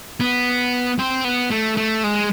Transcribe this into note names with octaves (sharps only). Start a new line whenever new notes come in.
B3
C4
B3
A3
A3
G#3